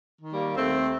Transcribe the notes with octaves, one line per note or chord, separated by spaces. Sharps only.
D#3
G3 A#3
D#2 A3 C4